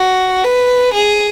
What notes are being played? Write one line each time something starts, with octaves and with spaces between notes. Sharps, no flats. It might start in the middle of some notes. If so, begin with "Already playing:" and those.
Already playing: F#4
B4
G#4